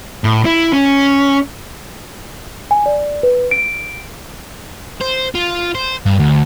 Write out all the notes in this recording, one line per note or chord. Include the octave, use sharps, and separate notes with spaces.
A2
E4
C#4
G#5
D5
B4
D7
C5
F4
C5
G2
D2